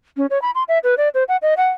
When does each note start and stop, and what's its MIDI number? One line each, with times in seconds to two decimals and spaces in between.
0.17 0.26 61
0.30 0.41 73
0.42 0.51 83
0.55 0.63 84
0.68 0.78 76
0.84 0.95 71
0.97 1.09 74
1.14 1.24 72
1.28 1.37 78
1.42 1.54 75
1.57 1.69 78